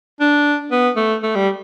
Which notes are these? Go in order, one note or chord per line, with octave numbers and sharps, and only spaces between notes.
D4
B3
A3
A3
G3